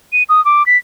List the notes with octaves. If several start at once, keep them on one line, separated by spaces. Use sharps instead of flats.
D#7
D#6
D6
B6